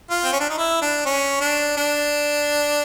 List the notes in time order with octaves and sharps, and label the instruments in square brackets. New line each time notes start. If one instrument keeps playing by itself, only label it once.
[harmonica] F4
C4
C#4
D4
D#4
E4
D4
C#4
D4
D4